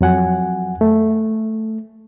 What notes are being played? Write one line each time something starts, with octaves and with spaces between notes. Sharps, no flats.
F2 F#3 F#5 G#5
A3